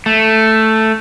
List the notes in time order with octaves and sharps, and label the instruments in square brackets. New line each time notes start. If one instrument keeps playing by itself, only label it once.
[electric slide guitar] A3